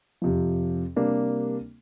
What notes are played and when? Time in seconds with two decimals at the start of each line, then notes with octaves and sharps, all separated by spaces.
0.22 F2 C3 F3
0.96 C3 G3 A#3 D4